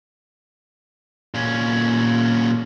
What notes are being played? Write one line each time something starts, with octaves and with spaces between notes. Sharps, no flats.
A#2 C#4